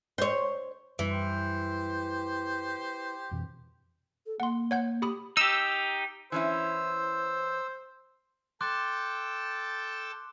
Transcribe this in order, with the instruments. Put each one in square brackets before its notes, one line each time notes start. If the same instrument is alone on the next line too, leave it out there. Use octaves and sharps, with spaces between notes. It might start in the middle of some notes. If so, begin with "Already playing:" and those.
[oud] C5 C#5
[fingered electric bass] F#2 G3 [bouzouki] E3
[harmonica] G4 C5
[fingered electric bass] F2 B2 E3
[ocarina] A4
[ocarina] A#3 [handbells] F#5 C6
[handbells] C#5 F#5 G6
G4 B5 D#6
[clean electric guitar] D#4 G4 [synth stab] E6
[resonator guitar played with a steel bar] E3 C#4 E4 [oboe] C5 [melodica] E6
[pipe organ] A4 G5 A5 [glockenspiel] C6 D6 F#6